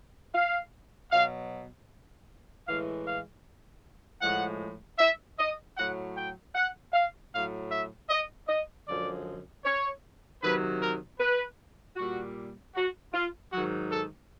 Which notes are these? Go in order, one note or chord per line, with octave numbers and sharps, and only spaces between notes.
F5
B2 F#3 F5
A2 E3 G#3 F5
F5
A2 F3 G#3 F#5
E5
D#5
A2 F#3 F#5
G5
F#5
F5
A2 F#3 F5
E5
D#5
D#5
F#2 D3 F3 G#3 D5
C#5
C3 D#3 F#3 B4
A#4
B4
A#2 G3 F#4
F#4
F4
G#2 D#3 F#3 F#4
A4